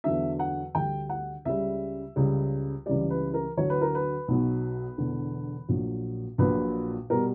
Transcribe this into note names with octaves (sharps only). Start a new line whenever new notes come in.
E2 D3 F#3 E5
F#5
D2 D3 G3 G5
F#5
C#2 C#3 G3 E5
C#2 C#3 G3
C#2 C#3 E3 G3 D5
B4
A#4
D2 D3 F#3 C#5
B4
A#4
B4
B1 B2 F#3
E1 E2 D3
A#1 A#2 F#3
A#1 A#2 F#3 B4
B2 G3 A#4